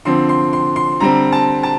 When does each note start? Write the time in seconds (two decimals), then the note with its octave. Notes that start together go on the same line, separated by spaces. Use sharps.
0.05 D3 F3 C4 C6
0.29 C6
0.53 C6
0.76 C6
1.00 D3 G3 C4 A#5
1.32 A5
1.63 A5